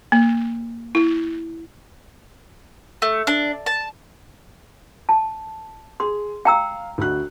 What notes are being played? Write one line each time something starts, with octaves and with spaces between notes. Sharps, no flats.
A#3
E4
A3
D4
A5
A5
G#4 C6
F5 G5 A#5 E6
D2 F#4 F#6